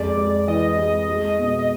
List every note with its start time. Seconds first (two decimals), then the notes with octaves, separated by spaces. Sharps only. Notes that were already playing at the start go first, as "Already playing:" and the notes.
Already playing: F2 G#3 D5
0.17 G#3
0.47 E3 D#5
0.78 G#3
1.08 G#3
1.39 B2
1.59 D#5